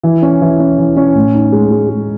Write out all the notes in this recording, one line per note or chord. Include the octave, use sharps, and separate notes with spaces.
E3
C#4
E3
C#4
E3
C#4
A2
D#4
G#3
G#3
G#3